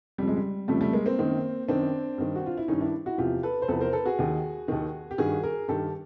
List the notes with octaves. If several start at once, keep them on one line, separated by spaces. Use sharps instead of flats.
F2 C#3 F3 G3
G#3
G3
F2 C#3 F3 G3 A3
G3 A3
G#3 A#3
A#3 C4
F#2 D#3
F#2 D#3 C4 D4
G2 D#3
F#4
F4
E4
G2 D#3 C#4 D#4
D4 E4
E4 F#4
E2 C3 F3 F4 G4
A4 B4
C5
E2 C3 F3 A4 B4
A#4 C5
A4 B4
F#4 G#4
D#2 D#3
D#2 D#3
G4
G2 D#3 F#4 G#4
G#4 A#4
G2 D#3 G4 A4